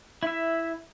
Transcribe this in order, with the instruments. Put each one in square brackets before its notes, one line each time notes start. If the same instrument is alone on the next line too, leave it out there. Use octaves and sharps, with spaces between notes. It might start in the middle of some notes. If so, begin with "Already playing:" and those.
[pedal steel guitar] E4 E5